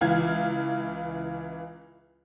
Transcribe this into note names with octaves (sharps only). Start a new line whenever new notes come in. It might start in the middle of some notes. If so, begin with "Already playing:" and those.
C#2 E3 F5 G#6